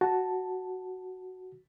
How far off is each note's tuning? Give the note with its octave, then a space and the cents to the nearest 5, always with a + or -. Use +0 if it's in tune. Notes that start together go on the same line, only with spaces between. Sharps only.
F#4 +0 A5 +0